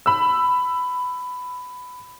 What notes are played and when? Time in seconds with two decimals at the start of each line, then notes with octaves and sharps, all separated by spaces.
0.06 B5 E6